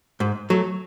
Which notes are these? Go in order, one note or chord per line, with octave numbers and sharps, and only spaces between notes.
G#2
F#3 A3